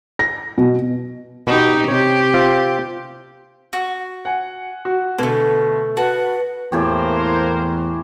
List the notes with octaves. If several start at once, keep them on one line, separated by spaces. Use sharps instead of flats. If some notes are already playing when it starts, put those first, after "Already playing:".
A#6
B2
B2 D#4 G4
C3 G4 C#5
C4 F4
F#4
F#5 G#5
F#4
D2 B2 A3 A#3
F#4 B4 F#5 A5
E2 A2 E3 A#3 G4 A#4 C5